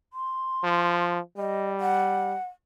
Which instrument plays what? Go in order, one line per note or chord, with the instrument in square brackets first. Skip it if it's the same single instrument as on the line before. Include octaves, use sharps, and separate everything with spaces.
[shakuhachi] C6
[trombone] F3
[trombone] G3 [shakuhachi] D#5
[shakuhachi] F#5